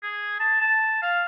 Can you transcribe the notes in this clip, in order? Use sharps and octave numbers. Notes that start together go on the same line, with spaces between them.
G#4
A5
A5
F5